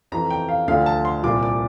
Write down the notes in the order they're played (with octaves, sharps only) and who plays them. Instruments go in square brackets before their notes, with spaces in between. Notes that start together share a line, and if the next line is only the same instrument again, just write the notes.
[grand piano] F2 E3 A#5
G5
F5
D2 D3 F3 F5
A5
C6
C2 A#2 F3 D6
D6